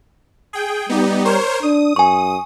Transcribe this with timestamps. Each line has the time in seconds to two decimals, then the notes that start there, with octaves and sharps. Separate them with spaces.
0.53 G#4 G5
0.89 G3 B3 D#4 G4
1.25 A#4 C5 C#5
1.63 D4 D#6
1.96 F#2 G#5 C#6